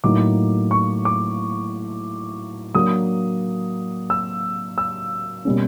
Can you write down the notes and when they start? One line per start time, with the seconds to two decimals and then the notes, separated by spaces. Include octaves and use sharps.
0.04 A2 F#3 A#3 D#4 D6
0.71 C#6
1.05 D6
2.75 F#3 A#3 D4 D#6
4.10 E6
4.78 E6
5.45 B2 G3 A#3 C#4